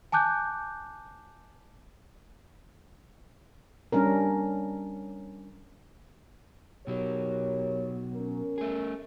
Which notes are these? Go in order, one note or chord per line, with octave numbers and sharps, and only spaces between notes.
G#5 A5 D6 F#6 G6
G3 C#4 D4 A#4
B2 F#3 G4 A#4 C#5
C#4 A#4
A3 G#4